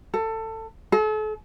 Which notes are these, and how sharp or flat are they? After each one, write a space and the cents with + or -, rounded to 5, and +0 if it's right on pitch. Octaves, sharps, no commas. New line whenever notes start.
A4 +20
A4 -40